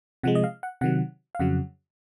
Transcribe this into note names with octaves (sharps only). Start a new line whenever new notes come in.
C3 F3 G#3 F#5
D#5
F5
F#5
C3 D#3 F#3 F#5
F5
F2 C#3 F#3 F#5